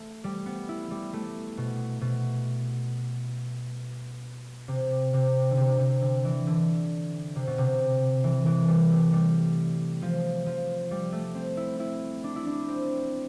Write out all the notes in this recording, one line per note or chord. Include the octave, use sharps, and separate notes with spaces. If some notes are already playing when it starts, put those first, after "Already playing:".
Already playing: A3
G3
B3
E4
G3
A3
B2
B2
C3
C3
D3
C3
C3
D3
E3
D3
C3
B2
C3
E3
E3
G3
A3
G3
F3
F3
G3
A3
C4
E4
E4
D4
E4
D4
C4